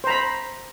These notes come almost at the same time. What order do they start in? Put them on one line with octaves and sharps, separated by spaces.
C5 A#5 B5